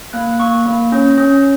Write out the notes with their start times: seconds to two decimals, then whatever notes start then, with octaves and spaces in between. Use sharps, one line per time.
0.13 A#3 F#6
0.40 A#3 C#6
0.66 A#3
0.92 C#4
1.18 C#4